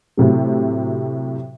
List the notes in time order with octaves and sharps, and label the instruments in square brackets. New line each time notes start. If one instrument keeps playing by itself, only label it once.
[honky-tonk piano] A2 C3 F#3